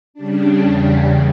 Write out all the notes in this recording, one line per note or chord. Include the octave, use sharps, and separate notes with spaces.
C#3 G3 D4
E2 C#3 G3